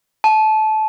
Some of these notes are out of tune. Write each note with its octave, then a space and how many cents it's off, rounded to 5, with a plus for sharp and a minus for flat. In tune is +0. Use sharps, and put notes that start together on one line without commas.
A5 -20